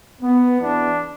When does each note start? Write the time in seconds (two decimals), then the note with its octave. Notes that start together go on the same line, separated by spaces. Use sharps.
0.21 B3
0.61 E2 E3 B3 D4